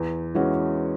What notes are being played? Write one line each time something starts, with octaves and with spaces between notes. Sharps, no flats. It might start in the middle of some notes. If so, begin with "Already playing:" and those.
Already playing: E2
E3 G#3 C#4 F#4